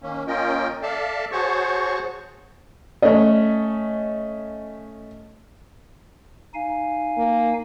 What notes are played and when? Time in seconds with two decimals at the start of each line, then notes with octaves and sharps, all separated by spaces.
0.02 D#3 A#3 C#4
0.27 A#3 C#4 F4 A#4 D#5 G5
0.82 A4 D5 E5 F5 A5
1.32 F#4 G#4 C5 C#5 A5 C#6
3.02 A3 C#4 D#5
6.54 D#4 F5 G#5
7.18 A#3